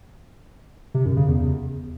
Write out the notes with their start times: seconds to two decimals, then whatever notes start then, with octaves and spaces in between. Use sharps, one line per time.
0.94 C3
1.06 F#2
1.17 C#3
1.28 E2